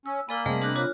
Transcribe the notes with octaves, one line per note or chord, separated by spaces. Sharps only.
C#4 E6
A#3 A#4 D5 G#5 B5
C3 G3 A3 G#4 D#5
D4 A#4 D6 F#6 G6
F4 C#5 F#6